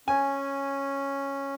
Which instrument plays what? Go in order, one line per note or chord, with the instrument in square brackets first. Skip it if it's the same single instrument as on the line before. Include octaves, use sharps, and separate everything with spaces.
[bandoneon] C#4 [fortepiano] G#5